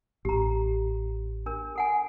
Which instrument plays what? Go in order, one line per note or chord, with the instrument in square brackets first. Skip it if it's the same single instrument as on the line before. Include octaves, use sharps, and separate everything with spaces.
[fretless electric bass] A1 [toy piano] G4 A#5
[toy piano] D4 A#4
A4 F#5 G#5